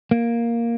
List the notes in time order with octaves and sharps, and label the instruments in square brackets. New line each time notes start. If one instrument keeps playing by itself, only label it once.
[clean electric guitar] A#3